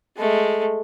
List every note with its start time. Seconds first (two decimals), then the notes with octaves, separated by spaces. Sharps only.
0.18 G#3 A3